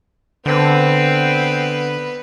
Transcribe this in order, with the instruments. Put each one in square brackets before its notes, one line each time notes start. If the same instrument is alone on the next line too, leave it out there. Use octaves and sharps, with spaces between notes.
[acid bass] D3 [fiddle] B3 B4 [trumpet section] C4